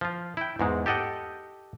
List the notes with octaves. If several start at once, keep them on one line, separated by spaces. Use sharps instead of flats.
F3 F4
E4 G5
E2 G#2 G#3
G4 A4 D#5 F#5 G5